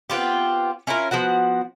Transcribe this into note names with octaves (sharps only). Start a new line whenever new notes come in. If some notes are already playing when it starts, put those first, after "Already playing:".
B3 C4 F4 G4
C#4 E4 F4 A#4
F3 B3 F#4 F#5